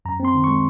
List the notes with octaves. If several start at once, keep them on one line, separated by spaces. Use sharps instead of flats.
F#2 A#5
C4 C6
D#3
G#3 C#6